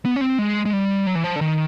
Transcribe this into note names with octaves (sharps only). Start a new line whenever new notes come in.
B3
C#4
C4
G#3
G#3
G3
F#3
E3
F3
D3
D#3